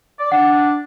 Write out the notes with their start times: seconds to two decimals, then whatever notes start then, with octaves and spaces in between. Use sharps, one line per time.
0.19 D5
0.32 D4 F#5